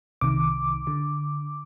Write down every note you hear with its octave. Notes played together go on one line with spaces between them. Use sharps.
C2 C3 D#3 D6
D3